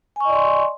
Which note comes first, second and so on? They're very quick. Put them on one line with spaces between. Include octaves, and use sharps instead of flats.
G#5 C#6 D#5 D5 C6